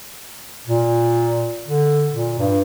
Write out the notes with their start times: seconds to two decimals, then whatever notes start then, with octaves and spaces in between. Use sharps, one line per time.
0.67 A#2
1.65 D3
2.12 A#2
2.38 G2